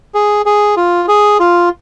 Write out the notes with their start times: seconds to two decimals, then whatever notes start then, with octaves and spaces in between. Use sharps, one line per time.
0.15 G#4
0.46 G#4
0.77 F4
1.08 G#4
1.40 F4